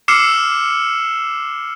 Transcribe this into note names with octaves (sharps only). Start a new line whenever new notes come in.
D6 E6 F6 C7 C#7 E7